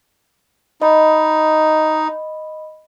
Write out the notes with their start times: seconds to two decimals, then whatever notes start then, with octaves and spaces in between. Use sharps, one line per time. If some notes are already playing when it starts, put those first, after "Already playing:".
0.82 D#4 D#5 B5